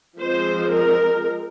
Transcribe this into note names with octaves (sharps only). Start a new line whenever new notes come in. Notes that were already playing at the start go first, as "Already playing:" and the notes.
F3 G#3 C4 C5
A#4